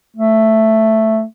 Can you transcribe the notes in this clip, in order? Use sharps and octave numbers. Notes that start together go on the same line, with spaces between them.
A3